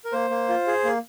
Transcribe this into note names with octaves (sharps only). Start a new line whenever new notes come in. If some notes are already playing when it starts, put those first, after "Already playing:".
A#4
A#3 C5
A#3
F4
G#4
A#3